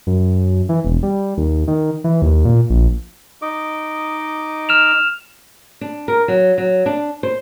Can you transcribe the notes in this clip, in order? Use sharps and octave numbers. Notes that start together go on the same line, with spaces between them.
F#2
E3
E1
G3
D#2
D#3
E3
D#2
A#2
A#1
D#4 D#5 D6
F6 E7 F7
D4
A#4
F#3
F#3
D4
C5